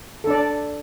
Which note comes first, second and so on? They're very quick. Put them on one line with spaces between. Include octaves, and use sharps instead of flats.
A4 D4 D5